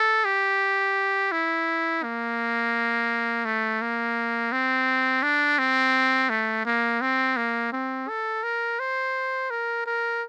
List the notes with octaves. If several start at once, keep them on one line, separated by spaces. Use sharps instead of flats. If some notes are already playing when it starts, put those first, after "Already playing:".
Already playing: A4
G4
E4
A#3
A3
A#3
C4
D4
C4
A3
A#3
C4
A#3
C4
A4
A#4
C5
A#4
A#4